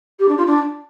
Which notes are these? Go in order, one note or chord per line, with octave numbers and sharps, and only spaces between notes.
G4
D4
F4
D4